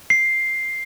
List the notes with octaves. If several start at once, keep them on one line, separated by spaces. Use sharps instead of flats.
C7